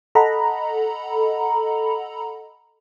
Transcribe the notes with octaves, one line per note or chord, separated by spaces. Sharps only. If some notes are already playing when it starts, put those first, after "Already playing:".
A4 D#5 F#5 A#5 B5